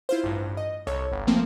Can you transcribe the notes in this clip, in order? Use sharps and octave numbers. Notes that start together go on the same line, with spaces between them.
E4 F4 C5
A1 G2
D#5
C2 A4 C#5
G1
F3 A3 A#3 C4